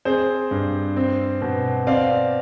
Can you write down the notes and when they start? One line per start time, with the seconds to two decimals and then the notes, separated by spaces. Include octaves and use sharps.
0.05 C4 G#4 C5
0.51 G2
0.96 C4
1.42 B2
1.87 C4 D5 F5